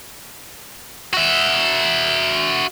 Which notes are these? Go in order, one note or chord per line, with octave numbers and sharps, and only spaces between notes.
F#4 E5